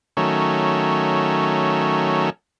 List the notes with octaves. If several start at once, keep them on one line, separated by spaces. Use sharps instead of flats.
D#3 F#3 A3 C#4